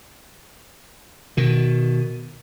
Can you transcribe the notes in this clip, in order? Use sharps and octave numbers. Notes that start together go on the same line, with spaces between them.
B2 D#3